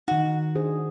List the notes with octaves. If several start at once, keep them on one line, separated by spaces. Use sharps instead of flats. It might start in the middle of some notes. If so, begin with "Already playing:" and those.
D#3 D#4 F#4
D4 G#4 C5